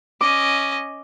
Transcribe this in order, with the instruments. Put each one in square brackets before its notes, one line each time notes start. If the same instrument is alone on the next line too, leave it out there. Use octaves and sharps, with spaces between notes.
[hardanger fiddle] C#4 D#5 [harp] D6